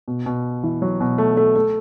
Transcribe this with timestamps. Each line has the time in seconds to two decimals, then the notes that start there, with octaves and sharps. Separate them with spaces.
0.08 B2
0.26 B2
0.63 E3
0.82 F#3
1.00 B2
1.18 A3
1.37 A3
1.56 A3